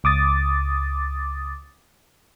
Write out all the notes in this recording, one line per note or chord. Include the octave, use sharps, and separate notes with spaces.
C#2 D6 D#6 A6